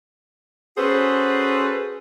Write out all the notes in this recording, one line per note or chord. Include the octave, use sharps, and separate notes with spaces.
C#4 F#4 G#4 A4 B4 C5